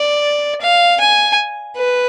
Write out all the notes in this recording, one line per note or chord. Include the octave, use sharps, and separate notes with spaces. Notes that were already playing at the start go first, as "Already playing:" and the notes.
Already playing: D5
F5
G#5
B4